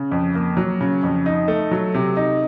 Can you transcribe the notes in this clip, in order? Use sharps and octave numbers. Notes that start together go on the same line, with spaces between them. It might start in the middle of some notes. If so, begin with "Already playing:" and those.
Already playing: C#3
F2
A#3
F#3
C#3
F2
D#4
A3
F#3
C3
D#4